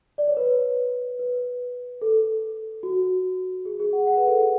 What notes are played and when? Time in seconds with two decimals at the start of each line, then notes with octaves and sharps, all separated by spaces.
0.18 D5
0.28 C#5
0.37 B4
1.19 B4
2.02 A4
2.83 F#4
3.65 G#4
3.80 G#4
3.93 F#5
4.07 F#5
4.17 B4
4.27 A4